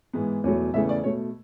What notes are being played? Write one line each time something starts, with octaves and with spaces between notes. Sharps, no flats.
G#2 E3 G#3 B3
E2 B2 F#3 A3 C#5
E2 C#3 E3 A3 E5
D5
B2 A3 C#5